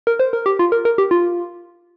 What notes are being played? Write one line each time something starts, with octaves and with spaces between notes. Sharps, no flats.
A#4
C5
A#4
G4
F4
A#4
A#4
G4
F4